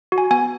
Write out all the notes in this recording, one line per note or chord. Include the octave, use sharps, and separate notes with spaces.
F#4
G#5
B3 G#5